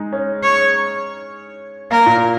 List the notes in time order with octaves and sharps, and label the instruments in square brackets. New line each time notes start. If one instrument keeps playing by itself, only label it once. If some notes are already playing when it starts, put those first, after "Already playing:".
Already playing: [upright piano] G#3 D#4
C#4
[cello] C#5
[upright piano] A#3 [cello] A#4
[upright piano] A#2